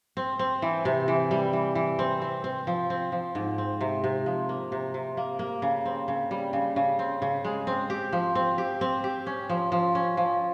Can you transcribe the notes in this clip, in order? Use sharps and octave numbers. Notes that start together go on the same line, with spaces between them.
C4
C4
E3
C3
E3
G3
E3
E3
C4
C4
C4
F3
C4
F3
G#2
C4
C3
C3
F3
A#3
C3
C3
A#3
A#3
C#3
C4
C#3
G3
C#3
C#3
C4
C#3
G#3
C4
G4
F3
C4
G4
C4
G4
C#4
F3
F3
C#4
F3